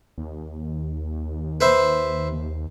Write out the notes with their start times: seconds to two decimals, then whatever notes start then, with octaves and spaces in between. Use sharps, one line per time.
0.18 D#2
1.61 B4 C5 E5